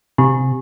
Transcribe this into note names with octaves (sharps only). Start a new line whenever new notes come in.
C3